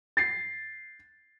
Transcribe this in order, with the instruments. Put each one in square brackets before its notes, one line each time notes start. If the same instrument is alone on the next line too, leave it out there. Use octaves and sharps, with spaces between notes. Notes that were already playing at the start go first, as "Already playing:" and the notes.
[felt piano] A6 C7